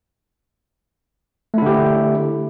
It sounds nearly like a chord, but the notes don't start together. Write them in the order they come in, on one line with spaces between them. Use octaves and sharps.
A3 E4 D3 G4